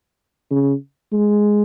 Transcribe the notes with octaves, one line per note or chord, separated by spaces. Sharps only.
C#3
G#3